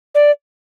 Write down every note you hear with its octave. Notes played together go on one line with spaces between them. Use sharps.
D5